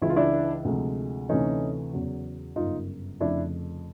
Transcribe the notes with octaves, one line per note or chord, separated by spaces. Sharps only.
C#2 C#3 E3 E4
F4
D4 E4
D2 C3 F3 G#3
D2 C3 E3 A3 C#4 D#4
E2 C#3 F#3
G1 F#2 C#3 D#4 F4
F1 F2 C#3 D4 E4